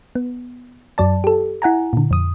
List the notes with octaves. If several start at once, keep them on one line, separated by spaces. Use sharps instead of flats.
B3
F#2 F#3 D5 A5
G4 A4
E4 F#5 G#5 A#5
A#2 D3
F2 D#6